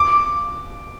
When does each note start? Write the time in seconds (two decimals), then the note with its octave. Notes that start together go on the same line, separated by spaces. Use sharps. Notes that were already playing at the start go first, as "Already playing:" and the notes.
Already playing: D6